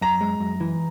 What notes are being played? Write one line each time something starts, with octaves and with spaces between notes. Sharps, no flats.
F#2 A#5
G#3
F#2
E3